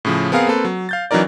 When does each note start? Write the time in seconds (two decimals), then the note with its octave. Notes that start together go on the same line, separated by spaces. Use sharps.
0.05 A2 C#3 F3
0.32 B3 C4 G#4 A#4 F5
0.47 A#3 C4 A4 B4
0.65 F#3
0.89 F5 G6 A6
1.11 E3 F#3 C#4 D#4 A#4 D5